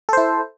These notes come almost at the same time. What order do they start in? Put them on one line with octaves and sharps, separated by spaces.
A4 C5 E4